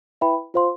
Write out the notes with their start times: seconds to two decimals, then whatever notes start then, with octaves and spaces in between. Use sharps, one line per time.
0.21 E4 B4 E5 G5 B5
0.54 F4 C5 F5 C6